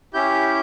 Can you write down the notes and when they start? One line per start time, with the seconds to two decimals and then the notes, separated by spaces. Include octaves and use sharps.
0.14 C#4 E4 G4 G6